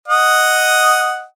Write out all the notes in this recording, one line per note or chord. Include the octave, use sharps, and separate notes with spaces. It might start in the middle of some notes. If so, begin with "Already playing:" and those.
D#5 F#5 D#6